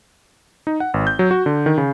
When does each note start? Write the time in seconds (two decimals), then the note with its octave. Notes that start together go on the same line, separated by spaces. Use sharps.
0.67 D#4
0.80 F#5
0.94 G#1
1.07 G6
1.19 F#3
1.31 F#4
1.46 D3
1.66 D#3
1.78 C#3